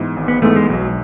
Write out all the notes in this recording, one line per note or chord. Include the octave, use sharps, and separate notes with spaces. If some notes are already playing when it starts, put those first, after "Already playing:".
Already playing: G#2 E3 G#3 B3
G#1
B3
G#2 E3 G#3 A3 B3
G#3
B1 F#3